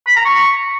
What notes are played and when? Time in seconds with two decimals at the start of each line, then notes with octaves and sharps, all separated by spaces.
0.07 B5
0.16 A#5
0.25 C#6